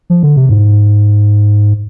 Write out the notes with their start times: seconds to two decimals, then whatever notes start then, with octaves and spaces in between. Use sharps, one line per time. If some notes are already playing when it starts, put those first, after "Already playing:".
0.10 F3
0.23 D3
0.36 C3
0.49 G#2